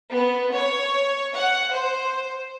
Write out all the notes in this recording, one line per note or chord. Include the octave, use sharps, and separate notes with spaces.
B3
C#5
F#5
C5